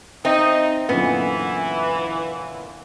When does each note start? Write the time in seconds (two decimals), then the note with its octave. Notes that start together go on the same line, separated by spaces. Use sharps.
0.25 C4 D#4 E5
0.89 F#2 A#2 D3 E3 B3